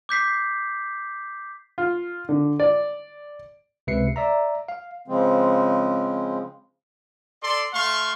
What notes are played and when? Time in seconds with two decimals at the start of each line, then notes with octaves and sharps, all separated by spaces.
0.09 D6 G6 B6 C7
1.78 F4
2.29 D3
2.60 D5
3.87 C#2 C3 B4 E5 C7 C#7
4.16 D5 E5 A#5
4.68 F5
5.08 C#3 F3 G#3 C4
7.42 A4 D5 C6
7.73 A3 F5 C6 C#6